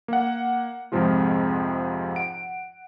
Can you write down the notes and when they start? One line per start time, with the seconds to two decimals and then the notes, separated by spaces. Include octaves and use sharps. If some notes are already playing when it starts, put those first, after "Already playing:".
0.08 A#3 F#5
0.92 F2 G#2 C3 F3 G#3 F4
2.15 F#5 D7